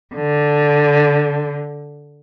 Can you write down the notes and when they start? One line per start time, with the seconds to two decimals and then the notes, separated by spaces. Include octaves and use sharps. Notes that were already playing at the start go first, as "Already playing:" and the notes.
0.15 D3